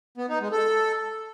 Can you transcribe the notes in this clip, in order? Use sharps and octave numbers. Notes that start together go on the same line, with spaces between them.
B3
D#4
G#3
A4